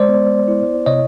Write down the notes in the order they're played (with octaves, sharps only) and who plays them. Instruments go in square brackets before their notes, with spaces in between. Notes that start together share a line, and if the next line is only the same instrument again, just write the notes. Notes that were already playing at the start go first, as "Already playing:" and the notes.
Already playing: [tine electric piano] G#3 C5 D5
B3
E4
C3 C#5 D#5